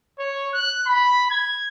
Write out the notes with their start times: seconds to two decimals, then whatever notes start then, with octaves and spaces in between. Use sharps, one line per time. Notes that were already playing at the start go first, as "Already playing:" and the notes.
0.19 C#5
0.54 F#6
0.86 B5
1.30 G#6